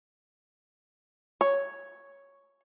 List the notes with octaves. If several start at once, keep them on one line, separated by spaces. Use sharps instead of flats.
C#5